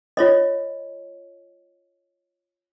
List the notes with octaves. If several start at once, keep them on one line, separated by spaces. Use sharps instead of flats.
F4 C#5 D#5